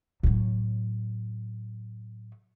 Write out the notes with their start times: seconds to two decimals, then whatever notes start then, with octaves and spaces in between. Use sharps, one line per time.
0.23 A2 F#3